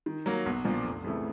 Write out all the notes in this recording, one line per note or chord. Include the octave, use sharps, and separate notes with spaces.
D#3
F#3 A#3
B1
A#2 F3 A#3 D4
F1
F2 C#3 E3 A3